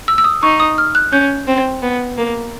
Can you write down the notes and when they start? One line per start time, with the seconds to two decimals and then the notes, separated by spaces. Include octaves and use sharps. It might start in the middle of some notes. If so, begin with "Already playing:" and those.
0.08 E6
0.18 E6
0.24 D#6
0.43 D#4 C#6
0.60 D#6
0.78 F6
0.95 F#6
1.12 C#4 G6
1.47 C4
1.82 B3
2.18 A#3